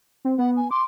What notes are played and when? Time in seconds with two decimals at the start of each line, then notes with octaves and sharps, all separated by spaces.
0.25 C4
0.38 B3 F#5
0.57 G#5
0.71 C6 D6